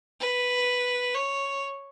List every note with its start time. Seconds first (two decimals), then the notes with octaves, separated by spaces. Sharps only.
0.20 B4
1.15 C#5